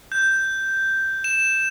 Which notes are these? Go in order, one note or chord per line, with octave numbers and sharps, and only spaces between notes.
G6
E7